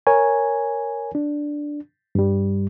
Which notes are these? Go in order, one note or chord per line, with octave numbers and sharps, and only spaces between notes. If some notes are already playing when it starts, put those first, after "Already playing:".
A#4 C#5 G#5
D4
G2 G3